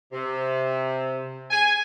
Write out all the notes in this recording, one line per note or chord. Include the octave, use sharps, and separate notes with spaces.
C3
G#5